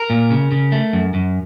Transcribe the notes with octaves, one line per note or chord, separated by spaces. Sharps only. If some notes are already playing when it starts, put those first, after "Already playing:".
Already playing: A#4
A#2
C#3
C#3
A3
F#2
F#2